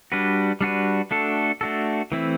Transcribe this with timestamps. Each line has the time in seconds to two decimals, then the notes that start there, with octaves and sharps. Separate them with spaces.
0.12 G3 D4 F#4 B4
0.61 G3 D4 F#4 B4
1.11 A3 D4 F#4 A4
1.61 A3 D4 F#4 A4
2.12 E3 A3 C4 E4